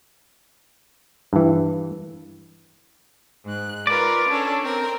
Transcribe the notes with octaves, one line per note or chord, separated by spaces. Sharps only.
G2 E3
G#2 F#6
F4 A#4 B4 D5
C#4 D4 A4
C4 A#4 G5